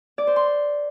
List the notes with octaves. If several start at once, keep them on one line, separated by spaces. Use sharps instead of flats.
D5
C5
C6